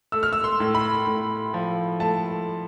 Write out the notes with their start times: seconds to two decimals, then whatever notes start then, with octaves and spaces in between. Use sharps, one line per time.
0.12 A3 E6
0.23 F6
0.33 E6
0.44 C6
0.60 A2
0.75 B5
1.07 A2
1.54 F3
2.00 A3 A5